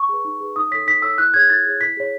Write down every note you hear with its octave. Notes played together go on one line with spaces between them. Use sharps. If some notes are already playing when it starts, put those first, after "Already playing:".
Already playing: C#6
G#4 B4
D#4
G#4 B4
D#4 D#6
A4 C#5 B6
D#4 B6
A4 C#5 E6
E4 F#6
G#4 C#5 G#6
E4 A6
G#4 C#5
E4 B6
G#4 C#5